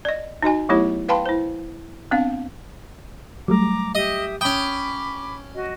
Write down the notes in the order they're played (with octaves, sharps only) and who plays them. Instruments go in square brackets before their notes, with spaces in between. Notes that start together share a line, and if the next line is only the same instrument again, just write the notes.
[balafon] D5 D#5
D#4 F#4 D#5 G#5
F#3 A3 B3 E4 G4 C#5
B4 F5 G5 A5 B5 C6
E4 C5
B3 C4 D4 F5
[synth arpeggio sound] F#3 G3 A3 [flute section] A#5 D6
[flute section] G4 E5 D#6 [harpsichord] D#5
[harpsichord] C#4 G5 [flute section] B5 D6 [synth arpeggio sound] D#6
[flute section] F#4 D#5